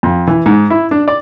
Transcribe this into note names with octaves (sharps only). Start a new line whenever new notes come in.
F2
E3
G#2
E4
D4
D5